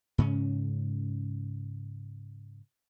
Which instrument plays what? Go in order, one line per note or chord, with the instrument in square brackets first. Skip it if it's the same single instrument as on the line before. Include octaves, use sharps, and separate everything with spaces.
[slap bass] G#2 C#3 C#4